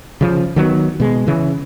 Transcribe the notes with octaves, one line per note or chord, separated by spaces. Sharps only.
C#3 F3
D#3 F#3 A#3 B3
B2 G#3
C#3 E3